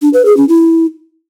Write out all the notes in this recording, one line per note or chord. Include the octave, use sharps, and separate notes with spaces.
D4
B4
G#4
C#4
E4